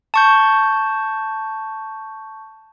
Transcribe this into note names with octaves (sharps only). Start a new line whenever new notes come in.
A5 C#6 G6